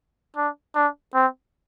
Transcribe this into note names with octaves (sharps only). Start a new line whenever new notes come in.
D4
D4
C4